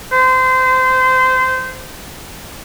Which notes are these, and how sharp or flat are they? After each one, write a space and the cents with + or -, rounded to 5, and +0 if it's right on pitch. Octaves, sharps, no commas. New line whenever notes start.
C5 -25